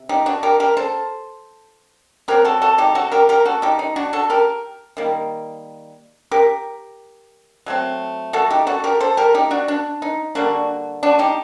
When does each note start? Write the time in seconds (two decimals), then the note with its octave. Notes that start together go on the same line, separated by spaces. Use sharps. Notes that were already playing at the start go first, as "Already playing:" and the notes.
Already playing: C3
0.09 D#4 G4
0.26 D4 F#4
0.43 G4 A#4
0.60 G4 A#4
0.77 A4 C5
2.28 F#3 C4 G4 A#4
2.45 F#4 A4
2.62 F#4 A4
2.78 D#4 G4
2.95 F#4 A4
3.12 G4 A#4
3.29 G4 A#4
3.45 F#4 A4
3.62 D#4 G4
3.79 D#4
3.96 D4 F#4
4.13 F#4 A4
4.30 G4 A#4
4.97 D#3 G3 A#3
6.31 G4 A#4
7.66 F#3 A3 C4
8.33 F#4 A4
8.50 D#4 G4
8.67 F#4 A4
8.84 G4 A#4
9.00 A4 C5
9.17 G4 A#4
9.34 D#4 G4
9.51 D4 F#4
9.68 D4
10.02 D#4
10.35 D3 G3 A#3 D4 F#4
11.03 D4 F#4
11.19 D#4 G4